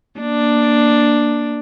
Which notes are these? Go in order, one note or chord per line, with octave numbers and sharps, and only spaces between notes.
A#3 D4